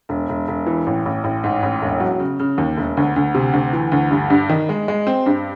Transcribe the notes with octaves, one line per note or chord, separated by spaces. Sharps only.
E1
E1
E1
E3
A1
A1
A1
G#2
A1
E1
F#3
C#3
C#3
D#2
E1
D2
D2
C3
D2
E3
D2
G2
G2
D#3
G#3
G#3
C4
G2